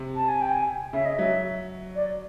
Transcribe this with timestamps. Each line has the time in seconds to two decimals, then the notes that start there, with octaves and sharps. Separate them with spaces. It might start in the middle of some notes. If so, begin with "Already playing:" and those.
Already playing: C3
0.16 A5
0.28 G#5
0.41 G5
0.54 G#5
0.93 C#3 E5
1.05 D#5
1.18 F#3 E5
1.96 D5